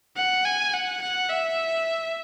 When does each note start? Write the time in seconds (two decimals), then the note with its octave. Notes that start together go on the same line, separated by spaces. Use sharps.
0.17 F#5
0.45 G#5
0.74 F#5
1.01 F#5
1.30 E5